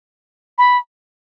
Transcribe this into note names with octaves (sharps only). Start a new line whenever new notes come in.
B5